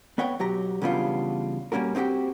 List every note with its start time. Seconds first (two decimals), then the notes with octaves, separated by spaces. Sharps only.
0.18 B3 B4 C#5 F#5 G5
0.39 B1 F#3 G4 A#5
0.82 C#3 E3 G3 B3 D4 F4
1.72 G3 A#3 C#4 F#4 A#4
1.95 C4 D#4 F#4 G4 G5